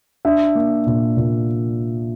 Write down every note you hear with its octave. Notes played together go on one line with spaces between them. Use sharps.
D4 E5
A#3
A#2
A#2